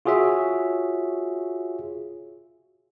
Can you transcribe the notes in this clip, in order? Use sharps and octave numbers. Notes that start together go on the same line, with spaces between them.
F4 F#4 G#4 C#5 E5